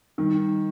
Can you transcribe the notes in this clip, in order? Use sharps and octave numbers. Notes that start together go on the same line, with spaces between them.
D#3 G3